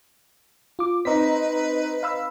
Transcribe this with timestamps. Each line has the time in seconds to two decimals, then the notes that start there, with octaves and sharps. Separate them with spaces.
0.79 F4 D6
1.05 C4 D#4 B4 A#5 B6
2.03 F5 B5 E6